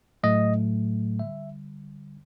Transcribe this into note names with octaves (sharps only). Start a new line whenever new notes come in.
A2 F#3 A3 D#5
D3 G3 E5